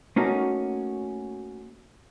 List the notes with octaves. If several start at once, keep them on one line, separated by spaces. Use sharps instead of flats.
A3 A#3 C#4 D#4 F#4